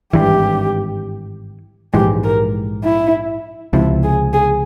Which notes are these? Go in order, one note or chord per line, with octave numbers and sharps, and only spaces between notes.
G#1 G2 E3 G4
A#1 G#2 E3 G#3 G4
A#4
E4
C#2 C3 F3 E4
G#4
G#4